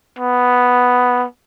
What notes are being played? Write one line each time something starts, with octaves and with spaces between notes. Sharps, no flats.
B3